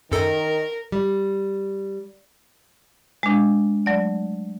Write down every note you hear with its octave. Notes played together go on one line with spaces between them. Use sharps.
F#2 D#3 A4 A#4
G3
G#3 D4
F#3 A3 D5